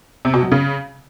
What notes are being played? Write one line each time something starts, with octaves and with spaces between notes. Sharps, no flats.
C3
B2
F#3
C#3